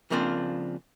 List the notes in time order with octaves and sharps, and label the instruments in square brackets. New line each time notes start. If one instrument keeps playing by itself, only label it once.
[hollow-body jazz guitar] C#3 F3 A#3 C4 D4 F4